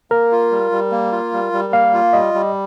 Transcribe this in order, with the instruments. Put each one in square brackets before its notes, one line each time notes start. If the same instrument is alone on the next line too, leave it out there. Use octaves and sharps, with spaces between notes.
[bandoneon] A#3 [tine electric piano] A#4
[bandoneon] F4
G3
G3
A#3
F4
G3
G3
[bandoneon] A#3 [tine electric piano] F5
[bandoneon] F4
[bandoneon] G3 [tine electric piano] D#5
[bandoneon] G3